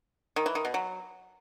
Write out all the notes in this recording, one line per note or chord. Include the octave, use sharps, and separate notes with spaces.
D#3
E3
D#3
B2
F#3